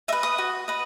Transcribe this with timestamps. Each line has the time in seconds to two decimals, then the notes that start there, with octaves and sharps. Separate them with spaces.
0.08 D#5 E5
0.12 B4
0.23 D#6
0.38 F#4
0.68 B4 D#5